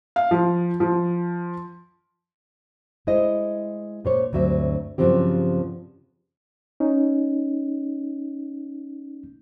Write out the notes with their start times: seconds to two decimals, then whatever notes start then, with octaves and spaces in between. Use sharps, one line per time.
0.16 F5
0.31 F3
0.80 F3
3.07 G#3 E4 C5 D#5
4.05 A#2 C5 C#5
4.33 D2 G2 F#3 C4 E5
4.98 G2 C#3 F3 F#3 C4 G4
6.80 C#4 D#4